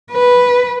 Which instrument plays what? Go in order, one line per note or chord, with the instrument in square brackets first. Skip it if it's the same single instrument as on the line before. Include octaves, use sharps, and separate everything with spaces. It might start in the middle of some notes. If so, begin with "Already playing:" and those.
[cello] B4